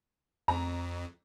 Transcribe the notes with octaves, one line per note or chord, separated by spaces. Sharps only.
F2 A#5